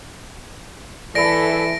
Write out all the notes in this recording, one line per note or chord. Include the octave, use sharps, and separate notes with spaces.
E3 A4 D5 E5 B5 A#6 D7